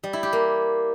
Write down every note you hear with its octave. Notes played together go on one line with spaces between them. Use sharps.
G3
E4
G4
A#3